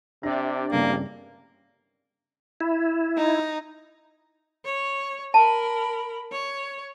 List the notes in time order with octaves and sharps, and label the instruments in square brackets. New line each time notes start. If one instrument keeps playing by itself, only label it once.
[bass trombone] C3 [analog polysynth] D4 G4 D5 [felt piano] E5 A#6
[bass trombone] A1 [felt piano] G2 C#3 C4 [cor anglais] A#3
[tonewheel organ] E4
[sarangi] D#4
[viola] C#5
[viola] A#4 B5 [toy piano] A5
[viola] C#5